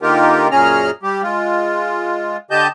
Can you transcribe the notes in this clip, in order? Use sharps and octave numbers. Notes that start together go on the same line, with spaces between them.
D3 A#3 D#4 F4 G4 A#4
F#2 A#2 C#4 G#4 A#5 F6
G3 G4
G#3 F4
D3 G4 D#5 A5 G6